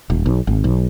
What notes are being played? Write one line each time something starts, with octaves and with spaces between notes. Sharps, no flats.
D#1
B1
G#1
B1